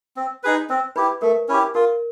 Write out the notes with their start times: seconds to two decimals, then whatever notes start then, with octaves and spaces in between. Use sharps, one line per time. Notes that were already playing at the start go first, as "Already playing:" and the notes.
0.16 C4
0.43 D#4 G#4 B4
0.70 C4 C5
0.96 E4 G4 B4
1.22 A3 A#4
1.48 C#4 E4 G4
1.75 F4 A#4